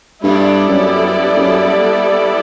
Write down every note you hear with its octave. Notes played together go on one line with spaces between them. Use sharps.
G2 G3 B3 E4 A4 D5
F#2
F#2